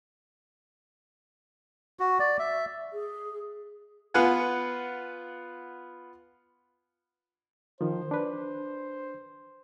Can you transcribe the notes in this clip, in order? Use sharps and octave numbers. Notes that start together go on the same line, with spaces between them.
F#4
D5
E5
G#4
B3 F4 B4 F#5 G#5
D#3 F3 C5
D4 B4